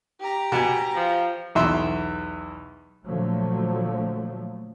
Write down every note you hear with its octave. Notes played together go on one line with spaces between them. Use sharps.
G4 A#5
B2 G#5
F3
B1 E2 E5 C6
A#2 D3 F3 F#3 A3